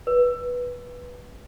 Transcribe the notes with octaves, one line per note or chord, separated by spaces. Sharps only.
B4